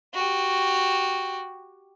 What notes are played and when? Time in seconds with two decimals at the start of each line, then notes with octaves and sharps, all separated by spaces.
0.14 F#4 G4